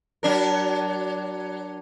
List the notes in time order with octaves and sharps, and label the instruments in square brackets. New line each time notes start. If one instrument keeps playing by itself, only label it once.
[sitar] F#3 D4 A#4